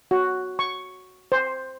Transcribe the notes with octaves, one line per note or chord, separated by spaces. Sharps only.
F#4
C#6
C5